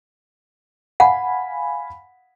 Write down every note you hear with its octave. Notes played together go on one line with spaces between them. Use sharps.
F5 F#5 G#5 B5